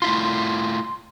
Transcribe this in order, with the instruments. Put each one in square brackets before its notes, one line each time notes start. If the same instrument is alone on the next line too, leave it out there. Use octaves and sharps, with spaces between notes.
[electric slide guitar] A3 E4 F4 [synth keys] C6